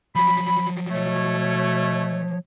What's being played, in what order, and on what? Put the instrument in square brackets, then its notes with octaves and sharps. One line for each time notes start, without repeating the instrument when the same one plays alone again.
[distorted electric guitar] F3 F#3 [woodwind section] B5
[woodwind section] B2 A3 C#5